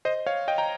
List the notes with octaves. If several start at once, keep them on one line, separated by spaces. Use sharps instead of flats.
C5 D#5
C#5 F5
D#5 G5
G5 A#5